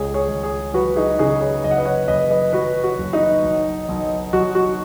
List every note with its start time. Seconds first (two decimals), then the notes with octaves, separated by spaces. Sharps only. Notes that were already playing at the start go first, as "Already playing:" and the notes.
Already playing: C#2 G#4 C#5
0.14 G#4 C#5
0.28 C#2
0.43 G#4 C#5
0.74 F#3 F#4 B4
0.96 D#4 G#4
1.19 C#3 D#4 G#4
1.41 G#4 C#5
1.64 F#1 D#5
1.71 F#5
1.78 B4 D#5
1.85 C#5 F#5
2.08 F#1 B4 D#5
2.30 B4 D#5
2.53 F#3 F#4 B4
2.84 F#4
2.98 F#1
3.13 D#4
3.43 B1
3.89 B1
4.33 B1 F#4
4.55 F#4